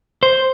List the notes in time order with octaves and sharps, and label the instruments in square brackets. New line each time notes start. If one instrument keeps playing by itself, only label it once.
[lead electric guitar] C5